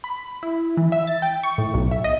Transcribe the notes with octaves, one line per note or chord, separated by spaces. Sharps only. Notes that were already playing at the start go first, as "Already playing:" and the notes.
B5
E4
E3
E5
A6
G5
C#6
A2
B1
E5
D#5